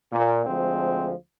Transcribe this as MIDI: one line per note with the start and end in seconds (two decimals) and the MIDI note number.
0.13 0.42 46
0.46 1.12 38
0.46 1.12 53
0.46 1.12 56
0.46 1.12 60